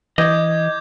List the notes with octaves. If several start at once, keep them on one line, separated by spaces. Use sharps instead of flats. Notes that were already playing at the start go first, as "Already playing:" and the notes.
E3 D#5 D6 G6 G#6